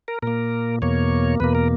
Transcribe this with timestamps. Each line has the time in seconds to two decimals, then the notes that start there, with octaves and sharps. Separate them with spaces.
0.08 A#4
0.22 A#2 A#3 A#4
0.82 E2 B2 A#3 C#5
1.40 E2 B2 A#3 B4
1.55 A#4